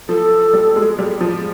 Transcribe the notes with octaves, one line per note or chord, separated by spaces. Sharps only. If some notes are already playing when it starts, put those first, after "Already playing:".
F3 A4
G3
G#3
G3
F3